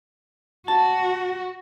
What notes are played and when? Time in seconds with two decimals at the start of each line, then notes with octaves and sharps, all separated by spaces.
0.68 F#4 A5